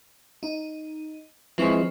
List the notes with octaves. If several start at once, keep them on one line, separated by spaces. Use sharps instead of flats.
D#4
E3 F3 G#3 C4 C#6